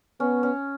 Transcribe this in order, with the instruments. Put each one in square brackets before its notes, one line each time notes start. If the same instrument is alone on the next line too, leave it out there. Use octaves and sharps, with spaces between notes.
[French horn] B3 [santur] C#4
[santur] C#4